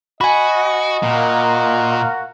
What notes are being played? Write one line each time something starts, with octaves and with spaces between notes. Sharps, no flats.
F#4 D#5 G#5 B5
A#2 F#4 A#4 F5